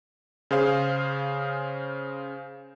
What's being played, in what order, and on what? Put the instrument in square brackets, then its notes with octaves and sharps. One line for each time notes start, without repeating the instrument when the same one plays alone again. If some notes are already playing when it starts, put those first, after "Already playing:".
[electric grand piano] C#3 G#4 C5 F5